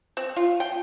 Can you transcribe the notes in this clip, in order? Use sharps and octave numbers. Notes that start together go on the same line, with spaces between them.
C4
F4
G5